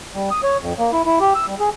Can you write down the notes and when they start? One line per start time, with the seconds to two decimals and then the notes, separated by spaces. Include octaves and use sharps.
0.15 G3
0.31 D#6
0.43 C#5
0.61 F2
0.79 A#3
0.93 E4
1.06 E4
1.20 G4
1.35 E6
1.47 G3
1.60 G#4